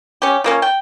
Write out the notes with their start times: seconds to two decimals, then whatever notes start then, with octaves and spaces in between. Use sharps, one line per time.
0.22 C#4 G4
0.44 F3 A#3 C#4
0.62 G5